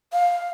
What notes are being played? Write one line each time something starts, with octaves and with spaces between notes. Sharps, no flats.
F5